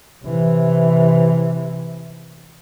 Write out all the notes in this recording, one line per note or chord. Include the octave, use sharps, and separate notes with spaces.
C3 E3